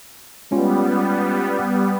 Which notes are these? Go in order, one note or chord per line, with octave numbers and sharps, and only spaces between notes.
G3 G#3 B3 C#4 F4